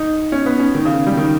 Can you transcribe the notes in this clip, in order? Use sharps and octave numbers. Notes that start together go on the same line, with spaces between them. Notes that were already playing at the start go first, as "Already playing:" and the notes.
Already playing: D#4
C#4
B3
C#4
D#3
C#3
G3
D#3